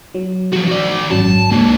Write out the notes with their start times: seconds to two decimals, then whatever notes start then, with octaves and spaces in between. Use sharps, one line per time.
0.15 F#3
0.53 F3 F#4
0.68 F#4 D5
1.11 G#1 F#2 F#3 A5
1.51 C#2 D3 A#3